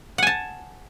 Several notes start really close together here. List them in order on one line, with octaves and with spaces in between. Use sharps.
F#5 G#5 A5